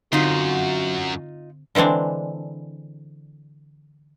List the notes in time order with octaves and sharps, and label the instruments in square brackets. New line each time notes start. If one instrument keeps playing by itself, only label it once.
[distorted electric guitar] F#2 [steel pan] D3 C4 [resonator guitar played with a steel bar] D#4 F4 [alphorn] F#4
[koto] D3 E3 G#3 C4 D4